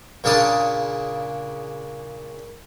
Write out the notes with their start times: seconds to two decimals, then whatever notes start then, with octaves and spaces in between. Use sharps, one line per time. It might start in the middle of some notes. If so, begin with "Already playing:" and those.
0.24 A#2 C#3 D4 F5 A5 D#6